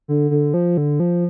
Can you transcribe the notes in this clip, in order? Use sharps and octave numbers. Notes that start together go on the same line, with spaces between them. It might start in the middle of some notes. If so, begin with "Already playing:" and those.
D3
D3
F3
D3
F3